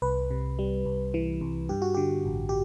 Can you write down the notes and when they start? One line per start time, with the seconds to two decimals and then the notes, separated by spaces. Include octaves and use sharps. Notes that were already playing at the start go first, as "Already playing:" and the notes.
0.02 C2 B4
0.31 C3
0.59 G3
0.85 C2
1.14 E3
1.41 C2
1.69 G2 G4
1.82 F#4
1.94 D3 G4
2.25 A1
2.49 G4